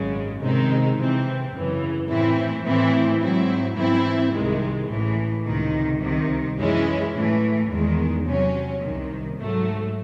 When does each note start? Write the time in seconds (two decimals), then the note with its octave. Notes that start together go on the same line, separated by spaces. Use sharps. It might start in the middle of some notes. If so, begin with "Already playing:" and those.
Already playing: G#1 F#2 C#3 G#3
0.41 C3 D#3 G#3 C4 D#4
0.97 C3 E3 C4
1.52 F#2 C#3 E3
2.09 A2 E3 C4 E4
2.65 A2 E3 C4 E4
3.21 G#2 F#3 C4 E4
3.78 G#2 E3 C4 E4
4.33 C2 C3 D#3 G#3
4.89 A1 A2 E3
5.46 C#2 C3 D#3
6.02 C2 C3 D#3
6.58 F#2 E3 G#3 C#4 E4
7.15 A2 E3 A3
7.70 E2 D#3 G#3
8.26 C3 F#3 C#4
8.82 C2 C3 D#3
9.38 G#2 F#3 A3